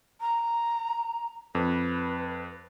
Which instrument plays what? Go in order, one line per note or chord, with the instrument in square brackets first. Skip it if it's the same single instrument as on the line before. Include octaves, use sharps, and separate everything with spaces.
[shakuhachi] A#5
[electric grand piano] F2 [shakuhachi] B4